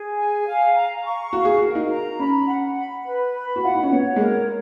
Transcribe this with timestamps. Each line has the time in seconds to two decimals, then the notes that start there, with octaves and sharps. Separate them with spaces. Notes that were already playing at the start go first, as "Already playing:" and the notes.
Already playing: G#4
0.17 G#5
0.46 F5
0.75 A#5
1.03 C#6
1.33 F#4 F5
1.45 G#4
1.57 F#4
1.62 A#4
1.75 D#4
1.90 A#5
2.18 C#4 B5
2.48 F#5
2.77 B5
3.06 B4
3.35 B5
3.56 F#4
3.63 F4 F#5
3.75 D#4
3.83 C#4
3.92 B3 C#5
4.16 G#3
4.20 A#3 A#4